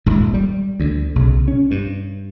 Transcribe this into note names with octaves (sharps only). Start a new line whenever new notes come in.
D#1 G#1 F2 G#2
G3
D2 D3
B1 C#3
C#4
G2